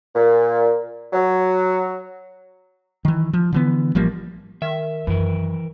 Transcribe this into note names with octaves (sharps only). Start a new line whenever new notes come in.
A#2
F#3
D#3 E3
F3
D3 E3 B3
A1 F3 G3 A#3
D#3 E5
F#2 E3 A#4